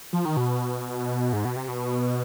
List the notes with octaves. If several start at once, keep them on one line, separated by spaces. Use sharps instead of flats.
F3
D#3
B2
G#2
B2
C3
B2